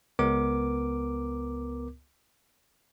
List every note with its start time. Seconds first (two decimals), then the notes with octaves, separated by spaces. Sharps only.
0.19 C#2 B3 A#4 D6